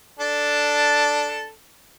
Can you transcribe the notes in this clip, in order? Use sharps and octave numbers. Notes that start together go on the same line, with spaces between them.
D4 A4